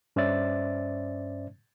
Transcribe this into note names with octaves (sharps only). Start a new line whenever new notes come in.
G2 C#4 C5 D5 E5 A6